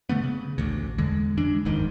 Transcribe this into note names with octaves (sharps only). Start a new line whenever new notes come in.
D3 A3 B3
C#3
A1 D2
E2 D3 G#3
F2 E3 G#3 D4
F#1 D#2 G#2 D#3